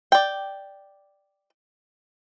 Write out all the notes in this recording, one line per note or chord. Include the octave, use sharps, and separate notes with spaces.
D5 G5